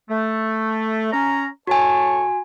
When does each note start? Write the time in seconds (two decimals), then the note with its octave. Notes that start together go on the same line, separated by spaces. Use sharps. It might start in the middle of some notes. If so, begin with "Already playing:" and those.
0.09 A3
1.13 C#4 A#5
1.67 A2 F#4 G#5 A5 C#6